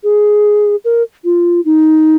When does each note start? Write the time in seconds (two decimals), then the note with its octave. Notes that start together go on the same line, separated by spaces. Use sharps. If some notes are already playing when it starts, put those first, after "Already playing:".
0.03 G#4
0.84 A#4
1.24 F4
1.65 D#4